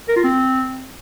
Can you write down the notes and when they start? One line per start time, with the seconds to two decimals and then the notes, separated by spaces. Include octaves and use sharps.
0.09 A#4
0.16 F4
0.24 C4